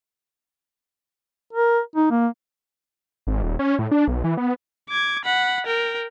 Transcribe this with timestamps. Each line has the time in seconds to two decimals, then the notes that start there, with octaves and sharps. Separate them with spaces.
1.53 A#4
1.95 D#4
2.11 A#3
3.27 G#1
3.43 D#1
3.59 C#4
3.79 A2
3.91 D4
4.08 B1
4.24 E3
4.37 B3
4.90 D6 G#6
5.25 F#5 B5
5.67 A#4 G5